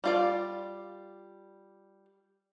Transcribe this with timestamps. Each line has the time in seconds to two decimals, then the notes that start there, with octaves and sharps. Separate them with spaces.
0.04 G3 F4 D5